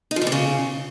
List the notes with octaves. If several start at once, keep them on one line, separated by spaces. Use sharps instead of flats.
D#4
F3
E3
C3
C#3